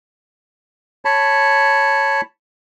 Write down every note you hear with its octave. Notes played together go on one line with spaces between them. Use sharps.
C#5 A5 B5